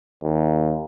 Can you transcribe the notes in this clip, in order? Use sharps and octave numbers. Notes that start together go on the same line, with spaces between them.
D#2